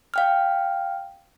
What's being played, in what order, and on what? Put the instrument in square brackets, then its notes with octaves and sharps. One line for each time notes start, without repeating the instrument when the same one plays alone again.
[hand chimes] F5 G5 F6